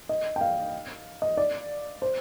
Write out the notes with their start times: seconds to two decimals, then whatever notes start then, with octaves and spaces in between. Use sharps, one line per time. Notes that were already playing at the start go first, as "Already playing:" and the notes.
0.09 D#5
0.36 G5
0.41 F5
1.22 D#5
1.37 D5
2.02 C5